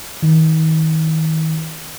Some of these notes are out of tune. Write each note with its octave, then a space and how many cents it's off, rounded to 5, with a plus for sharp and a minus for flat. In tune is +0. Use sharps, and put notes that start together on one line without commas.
D#3 +35